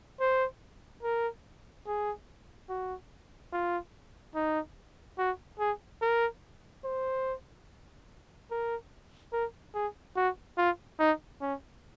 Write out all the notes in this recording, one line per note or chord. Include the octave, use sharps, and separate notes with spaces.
C5
A#4
G#4
F#4
F4
D#4
F#4
G#4
A#4
C5
A#4
A#4
G#4
F#4
F4
D#4
C#4